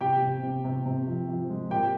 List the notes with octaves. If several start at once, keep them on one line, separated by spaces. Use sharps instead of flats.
C3 G4 G5
C3
C3
C3
C3
F3
F3
G#3
A#2 G4 G5